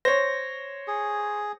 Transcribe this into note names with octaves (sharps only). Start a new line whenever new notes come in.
C5 C#5 A#6
G#4